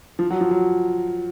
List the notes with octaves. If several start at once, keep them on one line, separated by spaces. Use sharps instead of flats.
F3
F#3
F3
F#3